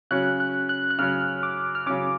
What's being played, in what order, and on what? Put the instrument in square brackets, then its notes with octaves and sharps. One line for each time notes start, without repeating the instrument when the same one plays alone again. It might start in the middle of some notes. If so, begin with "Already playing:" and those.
[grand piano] C#3 F#3 C#4 [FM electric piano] F#6
[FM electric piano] F#6
F#6
F#6
[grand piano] C#3 F#3 C#4 [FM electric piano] F6
[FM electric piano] D6
F6
[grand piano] C#3 F#3 C#4 [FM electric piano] D6